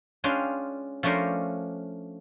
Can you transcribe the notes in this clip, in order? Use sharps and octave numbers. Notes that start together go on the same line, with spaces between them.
G#3 C#4 D4 F4 B4 G5
F3 A3 C#4 D4 A#4 C5